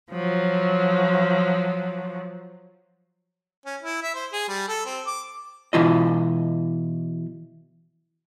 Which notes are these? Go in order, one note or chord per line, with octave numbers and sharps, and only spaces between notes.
F3 F#3
C#4
E4
E5
C5
G#4
G3
A4
C4
D6
B2 E3 F4 D#5